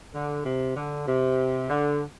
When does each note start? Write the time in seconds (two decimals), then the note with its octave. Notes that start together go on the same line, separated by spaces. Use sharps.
0.13 D3
0.44 C3
0.75 D3
1.07 C3
1.69 D3